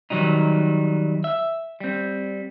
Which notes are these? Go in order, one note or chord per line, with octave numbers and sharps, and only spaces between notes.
D#3 F#3 G3 D#4
E5
G3 C4